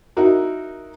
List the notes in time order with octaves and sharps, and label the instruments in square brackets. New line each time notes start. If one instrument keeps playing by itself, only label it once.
[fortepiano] D#4 E4 F#4 A#4